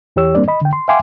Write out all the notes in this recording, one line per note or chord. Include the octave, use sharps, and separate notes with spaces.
E2 E3 G4 C#5 E6
G3 A#3 C4 D4 D5
D#5 B5
D3 G5
C6
E5 F5 G5 G#5 C6 D6